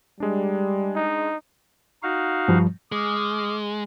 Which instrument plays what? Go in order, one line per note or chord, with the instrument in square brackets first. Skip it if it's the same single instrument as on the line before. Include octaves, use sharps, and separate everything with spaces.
[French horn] G3 [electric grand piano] G#3 D4
[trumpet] D#4
[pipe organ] D#4 F#4 F5
[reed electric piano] G2 F3 G3
[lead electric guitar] G#3 [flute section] D6 D#6 F6